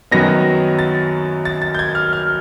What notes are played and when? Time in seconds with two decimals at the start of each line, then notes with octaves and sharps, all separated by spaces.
0.11 F#2 D#3 F#3 B3 A#6
0.79 A6
1.45 A6
1.62 A6
1.75 G6
1.79 G#6
1.95 F6
2.13 F6